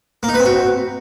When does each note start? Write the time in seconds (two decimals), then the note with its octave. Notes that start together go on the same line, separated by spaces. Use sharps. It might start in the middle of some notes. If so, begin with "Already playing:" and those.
0.23 A#3
0.29 D#4
0.34 B4
0.40 C4
0.45 F#4